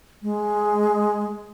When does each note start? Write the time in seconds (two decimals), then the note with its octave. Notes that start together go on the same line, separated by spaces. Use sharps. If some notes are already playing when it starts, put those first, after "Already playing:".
0.22 G#3